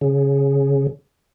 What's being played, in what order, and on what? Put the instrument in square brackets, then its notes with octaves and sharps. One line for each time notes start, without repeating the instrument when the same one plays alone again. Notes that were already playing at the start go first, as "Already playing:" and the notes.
[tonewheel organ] C#3